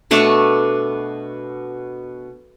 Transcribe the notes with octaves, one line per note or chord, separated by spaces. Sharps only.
B2 A3 D4 C#6